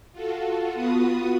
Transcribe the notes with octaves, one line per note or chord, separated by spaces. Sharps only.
F4 F#4 A4
B3 F4 F#4 B4 D#6